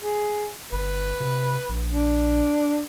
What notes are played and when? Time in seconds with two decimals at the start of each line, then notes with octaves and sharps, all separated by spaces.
0.03 G#4
0.72 G1 B4
1.20 C3
1.69 A#1
1.93 D4